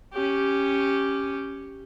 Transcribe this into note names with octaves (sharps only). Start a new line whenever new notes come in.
C#4 G4